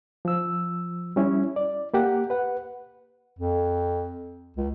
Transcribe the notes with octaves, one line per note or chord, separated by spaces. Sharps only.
F3 E6
G3 C#4 E4
D5
A#3 G4 F#5
B4 F#5
F2
C#2